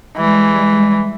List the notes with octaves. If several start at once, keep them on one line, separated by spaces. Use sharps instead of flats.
E3 G3 G#3